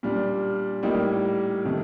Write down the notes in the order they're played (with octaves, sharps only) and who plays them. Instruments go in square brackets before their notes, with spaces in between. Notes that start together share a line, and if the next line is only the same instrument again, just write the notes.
[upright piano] A#2 G3 D4
A2 G3 A#3 D#4 G4
C3 D#3 A3